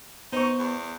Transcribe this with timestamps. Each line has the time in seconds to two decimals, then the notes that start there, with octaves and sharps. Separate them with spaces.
0.33 B3 D#4 C5 C#6
0.58 E2